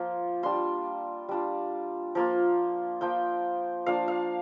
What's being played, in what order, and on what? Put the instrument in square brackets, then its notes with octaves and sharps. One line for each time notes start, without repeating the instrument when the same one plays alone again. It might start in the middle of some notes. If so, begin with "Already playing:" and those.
Already playing: [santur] F3 A#3 F4
G3 D4 F4 C6
G3 D4 F4
F3 A#3 F4
F3 A#3 F4 G5
F3 A#3 D4 F5
F5